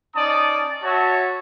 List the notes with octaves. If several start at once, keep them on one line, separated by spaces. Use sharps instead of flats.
C#4 D#4 D5 A5 D#6
F#4 C#5 E5 A5